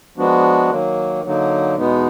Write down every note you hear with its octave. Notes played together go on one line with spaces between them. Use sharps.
F3 G#3 B3 D4 F#4
D#3 F#3 A#3
D3 F#3 A#3 D#4
E2 B2 G#3 B3 D#4